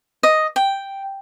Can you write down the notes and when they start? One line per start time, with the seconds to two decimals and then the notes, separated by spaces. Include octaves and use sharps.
0.23 D#5
0.56 G5